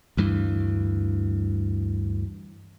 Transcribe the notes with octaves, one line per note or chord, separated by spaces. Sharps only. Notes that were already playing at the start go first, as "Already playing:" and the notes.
D2 G2 E3